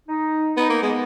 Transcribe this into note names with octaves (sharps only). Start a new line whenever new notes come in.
D#4
B3 D#4
A#3
G#3 B3